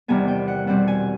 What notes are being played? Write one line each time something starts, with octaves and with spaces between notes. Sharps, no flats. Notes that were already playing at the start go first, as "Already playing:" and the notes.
E2 C3 D#3 G3 B3 G#5
G5
F#5
B2 G3 C4 F#5
G#5